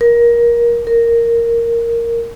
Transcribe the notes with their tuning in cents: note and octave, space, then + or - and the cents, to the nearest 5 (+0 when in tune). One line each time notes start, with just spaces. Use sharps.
A#4 +20
A#4 -5